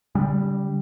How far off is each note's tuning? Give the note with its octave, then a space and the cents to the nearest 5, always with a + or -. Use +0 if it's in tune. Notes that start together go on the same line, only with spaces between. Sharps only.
D3 -45 G3 +0